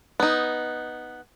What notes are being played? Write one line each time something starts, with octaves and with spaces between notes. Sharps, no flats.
B3 D#4